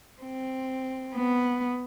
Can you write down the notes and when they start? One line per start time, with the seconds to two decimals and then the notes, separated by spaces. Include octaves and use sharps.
0.21 C4
1.15 B3